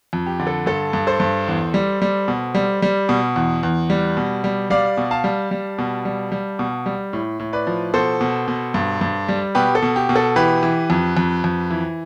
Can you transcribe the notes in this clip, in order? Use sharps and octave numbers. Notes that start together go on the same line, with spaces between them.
F2
G4
D3
A4
G2 A4
G2
A4 C5
G2
E2
G3
G3
B2
G3
G3
B2
E2
E2
G3
B2
G3
G3 D5 F5
B2
F5 A5
G3
G3
B2
G3
G3
B2
G3
A2
A2
B4 D5
F3
B2 A4 C5
B2
B2
G2
G2
G3
B2 G4 B4
A4
B2
G4
B2
A4
E3 G4 B4
E3
F2
F2
F2
E3